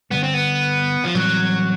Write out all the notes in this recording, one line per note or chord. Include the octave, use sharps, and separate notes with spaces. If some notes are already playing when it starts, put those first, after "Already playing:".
G2 D3 G3 B3
C4
B3
F3
A2 E3 F#3 G3 C4